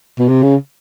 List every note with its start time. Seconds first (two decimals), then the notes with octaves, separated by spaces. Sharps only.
0.19 B2
0.28 C3
0.43 C#3